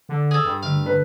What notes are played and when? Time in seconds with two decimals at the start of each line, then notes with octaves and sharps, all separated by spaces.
0.09 D3
0.31 G#4 A4
0.44 G2
0.63 D3 A3 F5
0.86 B4